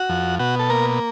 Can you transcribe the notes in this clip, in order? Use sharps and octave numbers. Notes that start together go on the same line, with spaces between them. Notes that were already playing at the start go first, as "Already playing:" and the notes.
Already playing: F#4
F2
B2 F#4
A4
A#3 A#4